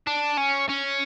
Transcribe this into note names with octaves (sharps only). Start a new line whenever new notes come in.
D4
C#4
C#4